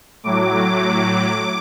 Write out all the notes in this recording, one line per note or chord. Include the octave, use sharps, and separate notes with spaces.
A2 F#3 D6